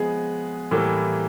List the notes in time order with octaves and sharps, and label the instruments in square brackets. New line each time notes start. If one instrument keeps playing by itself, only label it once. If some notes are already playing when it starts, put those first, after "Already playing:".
Already playing: [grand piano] F3 G#3 B3 G#4
A2 E3 G3 A#3 A4